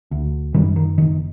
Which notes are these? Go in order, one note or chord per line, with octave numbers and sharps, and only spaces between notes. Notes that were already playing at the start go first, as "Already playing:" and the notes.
D2
F#2 D#3 G3
D#3
F#1 D#3